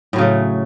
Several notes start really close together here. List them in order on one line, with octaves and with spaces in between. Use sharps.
A2 F#3 C#3 A3